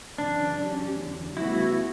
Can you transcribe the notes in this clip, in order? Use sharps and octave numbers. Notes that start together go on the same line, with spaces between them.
F#2 C#3 E3 D4
F#3 C#4 G4
E2 D3 F#3
D2 C#3 G3 B3 E4 F#4